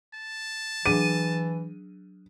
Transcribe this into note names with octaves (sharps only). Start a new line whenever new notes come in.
A5
E3 F#3 D4 G#4 D#7